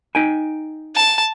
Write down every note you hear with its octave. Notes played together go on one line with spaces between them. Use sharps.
D#4 G5 G#5
A5